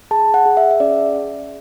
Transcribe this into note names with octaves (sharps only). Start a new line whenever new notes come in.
G#4 A5
F#5
G#4
E5
E5
C#4 D5